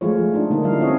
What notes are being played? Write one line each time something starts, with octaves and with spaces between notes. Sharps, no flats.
F3 G#3 A3 F4 C#5
F3
D4 D#4
D3 A#3 D#4
F3 G3 E4 F5
C4 C#4 F4 A4 C#5 D#5